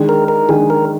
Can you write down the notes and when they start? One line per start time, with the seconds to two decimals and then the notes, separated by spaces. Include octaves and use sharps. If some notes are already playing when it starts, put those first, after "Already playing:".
Already playing: D#3 G#3 D4
0.09 A#4
0.28 A#4
0.49 D#3 G#3 D4 G#4
0.70 A#4